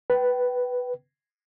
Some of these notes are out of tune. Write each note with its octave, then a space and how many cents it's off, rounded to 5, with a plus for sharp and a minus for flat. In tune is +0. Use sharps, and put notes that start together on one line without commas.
B4 +0 G5 -30